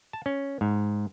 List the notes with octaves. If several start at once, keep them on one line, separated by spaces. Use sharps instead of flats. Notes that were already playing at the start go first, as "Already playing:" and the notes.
A5
C#4
G#2